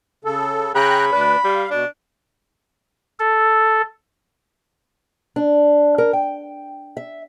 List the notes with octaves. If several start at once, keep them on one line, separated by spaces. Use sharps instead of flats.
C#3 A4
C#3 G5 A#5 B5 F#6
D2 D4 B4
G3 F5
B2 D4
A4
D4
A#4
G5
E5